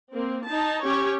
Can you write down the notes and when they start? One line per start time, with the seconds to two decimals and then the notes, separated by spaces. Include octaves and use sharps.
0.11 A#3 C4
0.45 D#4 A5
0.83 C#4 G4 C#5